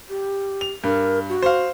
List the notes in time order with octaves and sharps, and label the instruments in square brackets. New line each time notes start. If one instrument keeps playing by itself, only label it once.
[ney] G4
[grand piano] F7
[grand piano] G2 [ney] A#4
[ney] F#4
[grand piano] C5 F5